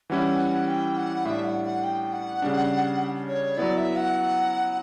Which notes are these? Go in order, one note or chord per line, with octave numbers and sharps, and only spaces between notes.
E3 G3 C#4 E4 F#5
G5
F#5
A2 G3 D4 E5
F#5
F#5
G5
F#5
C#3 G3 D4
C#5
F#3 B3 E4 D5
E5
F#5